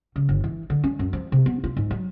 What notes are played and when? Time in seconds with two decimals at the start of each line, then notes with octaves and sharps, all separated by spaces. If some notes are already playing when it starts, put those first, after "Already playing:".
0.16 C#3
0.29 G1
0.44 E3
0.70 D3
0.84 C#4
0.99 F#2
1.13 F3
1.32 C3
1.46 B3
1.64 F4
1.77 G#2
1.91 F#3